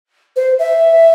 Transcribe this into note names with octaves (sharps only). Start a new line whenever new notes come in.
C5
E5